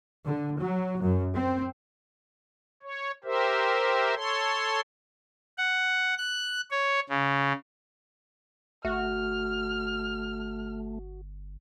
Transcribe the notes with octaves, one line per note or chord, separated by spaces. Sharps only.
D3
F#3
F#2
C4
C#5
G4 A#4 C5 E5
A4 C#5 C6
F#5
F#6
C#5
C#3
G1 A3 F#4 F6